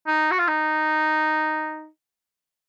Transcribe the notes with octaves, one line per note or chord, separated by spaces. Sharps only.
D#4
F#4
F4
D#4